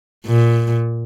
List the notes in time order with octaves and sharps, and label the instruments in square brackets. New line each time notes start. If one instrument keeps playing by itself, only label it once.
[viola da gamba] A#2